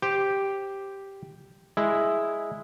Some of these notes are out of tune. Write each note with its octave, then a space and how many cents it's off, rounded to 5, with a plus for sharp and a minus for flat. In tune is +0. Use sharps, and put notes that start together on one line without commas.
G4 +0 C5 +0
G#3 +0 E4 +0